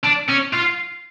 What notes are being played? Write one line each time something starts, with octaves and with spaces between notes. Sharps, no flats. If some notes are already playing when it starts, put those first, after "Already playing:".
D4
C#4
F4